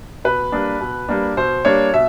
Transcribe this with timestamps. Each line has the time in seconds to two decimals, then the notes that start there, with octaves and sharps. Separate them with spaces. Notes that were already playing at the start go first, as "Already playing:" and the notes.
0.24 B2 B4
0.52 G3 A#3 D4
0.81 B2
1.09 G3 A#3 D4
1.37 B2 C5
1.65 G3 A#3 D4 C#5
1.93 B2 E5